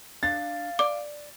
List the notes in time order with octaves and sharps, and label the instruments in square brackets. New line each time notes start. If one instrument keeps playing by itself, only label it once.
[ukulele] D4 [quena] F5 [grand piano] A6
[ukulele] D5 [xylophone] D6